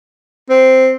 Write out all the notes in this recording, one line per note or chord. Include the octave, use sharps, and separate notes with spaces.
C4